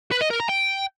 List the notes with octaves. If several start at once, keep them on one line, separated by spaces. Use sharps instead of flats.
B4
D#5
A#4
A#5
G5